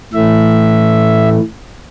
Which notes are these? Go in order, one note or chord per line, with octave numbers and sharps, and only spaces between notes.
A2 E3 A3 E5